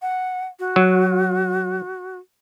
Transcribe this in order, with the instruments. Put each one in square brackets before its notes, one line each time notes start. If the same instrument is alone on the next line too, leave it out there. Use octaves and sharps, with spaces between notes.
[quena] F#5
F#4
[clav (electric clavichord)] F#3